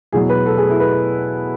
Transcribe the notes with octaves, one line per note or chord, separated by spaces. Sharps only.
E2 B2 F#3 G#4
B4
A4
G#4
E4
B4